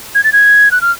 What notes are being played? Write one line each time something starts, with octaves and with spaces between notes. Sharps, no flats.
G#6
A6
G#6
F#6
F6